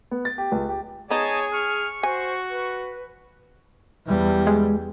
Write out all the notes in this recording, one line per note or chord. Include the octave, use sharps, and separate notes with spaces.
B3
A6
G4
C#2
G4
B3 D#4 G#4 C#5 D#5 G#5 A5
C#6 F6
F#4 C5 G#5
B4
E2 G3
G#3